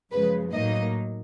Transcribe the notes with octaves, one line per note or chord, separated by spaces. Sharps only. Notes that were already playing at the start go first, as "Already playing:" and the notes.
F#2 C#3 F3 G#3 B4
A2 F#3 A#3 D#4 D#5